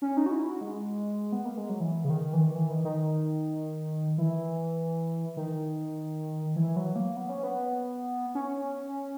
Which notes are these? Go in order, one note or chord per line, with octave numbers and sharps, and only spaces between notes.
C#4
D#4
F#4
E4
F#4
G#3
B3
A#3
G#3
F#3
E3
C#3
D#3
E3
D#3
E3
D#3
D#3
E3
D#3
E3
F#3
A#3
B3
C#4
B3
C#4